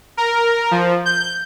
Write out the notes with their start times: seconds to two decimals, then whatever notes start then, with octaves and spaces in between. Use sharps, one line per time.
0.17 A#4
0.71 F3
1.05 G6